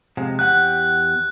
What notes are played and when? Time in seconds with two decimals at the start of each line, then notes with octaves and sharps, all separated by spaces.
0.17 C3 F3 G#3
0.39 E2 G4 F#5 F#6